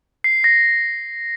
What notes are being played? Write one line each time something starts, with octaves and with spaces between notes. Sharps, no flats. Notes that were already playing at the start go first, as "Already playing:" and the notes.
C7
A#6